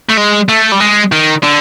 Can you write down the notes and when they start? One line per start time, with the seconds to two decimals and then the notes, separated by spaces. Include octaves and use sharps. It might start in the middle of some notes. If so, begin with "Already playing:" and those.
0.10 A3
0.18 G#3
0.49 A3
0.72 G3
0.80 G#3
1.12 D#3
1.43 D3